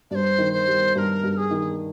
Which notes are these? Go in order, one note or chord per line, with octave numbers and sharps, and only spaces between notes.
G2 C5 D5
D#3
C5
G3
G2 A#4 C5
G2
G#4
D#3